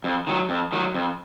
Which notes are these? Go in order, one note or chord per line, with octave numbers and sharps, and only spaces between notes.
F2
D#3 F#3
F2
D#3 F#3
F2